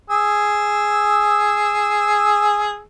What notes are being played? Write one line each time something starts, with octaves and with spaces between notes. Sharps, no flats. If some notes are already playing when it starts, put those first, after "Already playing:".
G#4 E6